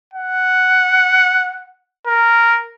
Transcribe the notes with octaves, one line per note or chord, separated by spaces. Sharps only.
F#5
A#4